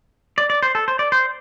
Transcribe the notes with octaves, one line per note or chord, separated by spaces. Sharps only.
D5
D5
C5
A4
C5
D5
C5